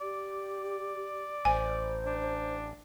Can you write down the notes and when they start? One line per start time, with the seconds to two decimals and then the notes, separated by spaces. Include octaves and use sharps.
0.01 G4 D5
1.45 A1 C5 G#5
2.06 D4